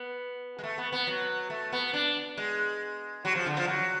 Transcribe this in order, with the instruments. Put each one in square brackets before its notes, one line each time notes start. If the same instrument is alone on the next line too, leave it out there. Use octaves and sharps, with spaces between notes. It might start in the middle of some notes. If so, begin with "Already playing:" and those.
Already playing: [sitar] B3
G#3
A3
B3
B3
F#3
A3
B3
D4
G#3
F#3
F3
D3
F3
F#3